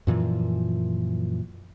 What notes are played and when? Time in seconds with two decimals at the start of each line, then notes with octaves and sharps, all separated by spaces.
0.07 F#2 A#2 E3 F3